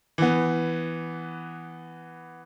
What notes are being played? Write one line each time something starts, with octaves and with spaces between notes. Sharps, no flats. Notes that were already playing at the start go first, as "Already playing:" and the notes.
E3 B3